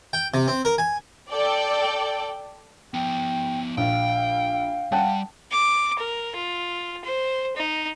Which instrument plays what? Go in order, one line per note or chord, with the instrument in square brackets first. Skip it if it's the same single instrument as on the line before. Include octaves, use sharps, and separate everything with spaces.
[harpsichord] G5
C3
C4
A#4
G#5
[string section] A4 D5 G5
[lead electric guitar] F3 B3 [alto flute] G5
[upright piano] A#1 [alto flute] F5 [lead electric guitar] G5
[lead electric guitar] G3 [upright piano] F#5 G5 A5
[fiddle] D6
A#4
F4
C5
D#4